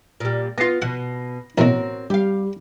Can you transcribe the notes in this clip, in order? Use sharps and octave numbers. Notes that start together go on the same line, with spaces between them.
A#2 G3
B3 F4 A#6 C7
B2 F#5
A1 B2 C4 F#4 A#4 C#5
G3 G4 F5